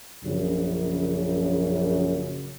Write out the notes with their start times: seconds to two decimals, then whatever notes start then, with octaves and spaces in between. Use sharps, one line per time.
0.24 A#1 F#2 C#3